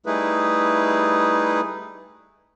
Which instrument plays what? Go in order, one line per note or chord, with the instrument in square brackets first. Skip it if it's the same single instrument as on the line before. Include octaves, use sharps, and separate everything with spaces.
[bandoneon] G3 A3 D#4 E4 G#4 B4